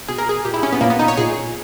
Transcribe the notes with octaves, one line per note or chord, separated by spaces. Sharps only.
B2 G#4
A#4
G#4
A#2 G4
E4
C#4
B3
A#2 A#3
B3
D#4
C#5
A#2 G#4